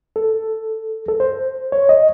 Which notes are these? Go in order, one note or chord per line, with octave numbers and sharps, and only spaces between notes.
A4
A4
C5
C#5
D#5